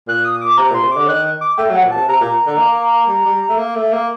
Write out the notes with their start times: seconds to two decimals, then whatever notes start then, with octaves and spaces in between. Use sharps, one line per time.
0.08 A#2 F#6
0.24 D#6
0.41 D6
0.58 C3 A#5
0.71 A#2 C6
0.84 C3
0.91 D3 D6
1.08 D#3 F#6
1.41 D6
1.58 A3 G5
1.70 F#3 F#5
1.84 A#2
1.91 A5
1.96 C3
2.08 C3 A#5
2.21 A#2
2.46 D3
2.58 A#3
3.08 G3
3.25 G3
3.49 A3
3.58 A#3
3.76 A3
3.92 A#3